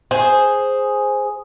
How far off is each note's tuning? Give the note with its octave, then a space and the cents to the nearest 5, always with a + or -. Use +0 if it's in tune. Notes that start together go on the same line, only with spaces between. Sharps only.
G#4 +0 C5 +0